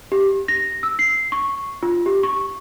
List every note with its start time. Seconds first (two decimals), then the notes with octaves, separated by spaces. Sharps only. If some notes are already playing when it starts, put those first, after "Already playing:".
0.12 G4
0.48 A#6
0.83 E6
0.99 C7
1.32 C#6
1.83 F4
2.06 G4
2.23 C#6